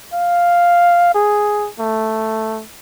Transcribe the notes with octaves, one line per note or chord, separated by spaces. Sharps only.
F5
G#4
A3